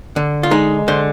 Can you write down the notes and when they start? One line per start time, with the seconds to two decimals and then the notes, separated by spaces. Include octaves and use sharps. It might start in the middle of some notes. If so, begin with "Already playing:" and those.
0.16 D3
0.43 F4
0.51 G#3 D#4
0.88 D3 C5